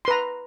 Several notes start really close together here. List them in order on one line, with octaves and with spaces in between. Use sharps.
C6 B4 A#5